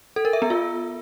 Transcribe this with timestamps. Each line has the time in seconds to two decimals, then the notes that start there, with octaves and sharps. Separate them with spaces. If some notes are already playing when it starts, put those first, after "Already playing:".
0.16 A4
0.25 A#4
0.33 E5
0.42 B3
0.50 F4